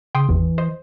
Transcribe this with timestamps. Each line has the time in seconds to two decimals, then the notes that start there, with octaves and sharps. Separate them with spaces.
0.15 C#3 G5 C6 D#6
0.29 G#1 E2 E3
0.58 C5 D#5